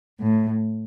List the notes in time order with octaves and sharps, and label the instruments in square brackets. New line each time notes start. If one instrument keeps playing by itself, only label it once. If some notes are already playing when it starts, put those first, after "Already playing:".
[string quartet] A2